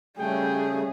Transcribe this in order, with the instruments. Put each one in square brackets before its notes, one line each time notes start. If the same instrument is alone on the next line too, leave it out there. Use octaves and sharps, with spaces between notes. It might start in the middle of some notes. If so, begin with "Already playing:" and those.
[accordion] C#3 A3 [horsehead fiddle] G3 C#4 [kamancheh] G#4 [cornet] G5